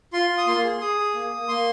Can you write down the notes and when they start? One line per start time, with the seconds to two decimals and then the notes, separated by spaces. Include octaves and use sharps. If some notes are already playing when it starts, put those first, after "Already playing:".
0.13 F4 C6
0.30 F4
0.38 D#6
0.47 A#3 C6
0.64 G#4
0.81 G#4 D#6
0.98 G#4
1.14 A#3
1.31 A#3
1.48 A#3 C6